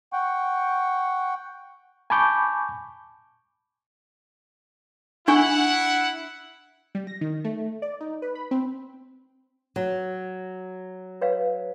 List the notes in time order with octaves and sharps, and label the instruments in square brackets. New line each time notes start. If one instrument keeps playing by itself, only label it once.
[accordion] F#5 G5 C#6
[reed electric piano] G#5 A5 B5 C#6 D6 G6
[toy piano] D4 G#5 C#6 [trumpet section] E4 F#5
[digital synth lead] G3
A#6
D#3
A3
D5
D#4
B4
B5
C4
[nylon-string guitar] F#3
[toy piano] B4 C#5 F5